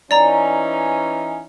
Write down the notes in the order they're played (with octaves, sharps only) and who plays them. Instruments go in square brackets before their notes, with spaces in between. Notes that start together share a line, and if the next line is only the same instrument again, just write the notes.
[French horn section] E3 C#4 D#4 [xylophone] D5 A#5